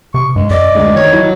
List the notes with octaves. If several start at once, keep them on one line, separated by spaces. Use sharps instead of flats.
C3 C#6
G2 G#3
F#2 D5 D#5
D2 G#3
D#3 C#5
F#3 E4